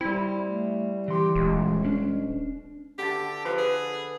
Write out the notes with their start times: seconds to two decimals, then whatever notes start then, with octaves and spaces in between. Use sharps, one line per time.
0.01 G3 C4 E4
0.44 A3
1.08 E3 G4 C6
1.35 D#1 G#3
1.85 C#4 D4
2.98 D3 G4 A5
3.45 F3 B4
3.58 G#4